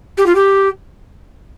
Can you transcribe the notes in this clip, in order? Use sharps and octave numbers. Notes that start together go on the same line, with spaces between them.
G4
F4
G4